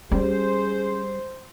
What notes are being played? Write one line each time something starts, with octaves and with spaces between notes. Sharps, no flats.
G3 C#4 G#4 C5